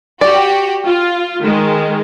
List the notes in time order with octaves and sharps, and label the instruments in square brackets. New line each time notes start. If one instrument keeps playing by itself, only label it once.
[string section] F#4 G4 [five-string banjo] D5
[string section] F4
D#3 G#3